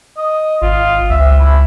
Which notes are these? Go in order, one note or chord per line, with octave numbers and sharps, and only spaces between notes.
D#5
G#1 F4
C#2 E5
E4